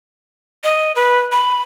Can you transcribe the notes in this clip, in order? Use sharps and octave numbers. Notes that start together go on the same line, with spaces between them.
D#5
B4
B5